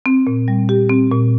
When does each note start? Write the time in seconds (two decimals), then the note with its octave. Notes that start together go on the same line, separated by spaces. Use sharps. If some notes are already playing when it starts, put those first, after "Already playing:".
0.06 C4
0.27 A#2
0.48 G3
0.69 G4
0.90 C4
1.11 A#2